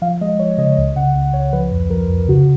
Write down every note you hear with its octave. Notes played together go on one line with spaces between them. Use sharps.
F3 F5
G#3 D#5
F3 C#5
C#3 D#5
C#5
C#2 D#5
C#3 F#5
C#2
C#2 C#5
F3 B4
F2
F3 A#4
F2
C#3 F#4